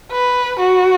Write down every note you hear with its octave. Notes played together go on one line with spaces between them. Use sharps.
B4
F#4